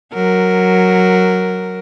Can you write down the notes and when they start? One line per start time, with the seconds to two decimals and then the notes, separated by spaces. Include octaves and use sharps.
0.13 F#3 A#4